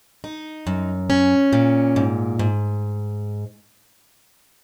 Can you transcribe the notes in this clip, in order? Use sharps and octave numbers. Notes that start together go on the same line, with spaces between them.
D#4
F#2
C#4
A#2
G#2
G#2